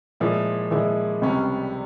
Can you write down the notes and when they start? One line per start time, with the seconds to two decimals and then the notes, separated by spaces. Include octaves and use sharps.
0.20 A#2 F3 G#3 E4
0.71 A#2 F3 G#3 E4
1.21 C#2 C3 G3 C#4